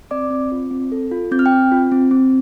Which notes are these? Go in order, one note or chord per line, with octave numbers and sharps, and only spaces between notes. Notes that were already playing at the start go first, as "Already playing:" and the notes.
C4 D5 D6
C4
F4
C4
A4
F4
C4 G6
F6
G5 G6
C4
F4
C4
C4